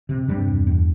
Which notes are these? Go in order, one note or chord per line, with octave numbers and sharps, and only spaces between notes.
C3
G2 C3 G3
E2
E2